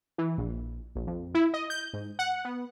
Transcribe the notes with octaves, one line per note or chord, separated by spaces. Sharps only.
E3
A#1
A#1
F2
E4
D#5
G6
G#2
F#5
B3